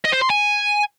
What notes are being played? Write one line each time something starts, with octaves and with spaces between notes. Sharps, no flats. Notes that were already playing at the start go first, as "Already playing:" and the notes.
D#5
C5
C6
G#5